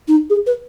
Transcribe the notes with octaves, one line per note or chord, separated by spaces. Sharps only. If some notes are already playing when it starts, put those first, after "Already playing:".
D#4
G#4
B4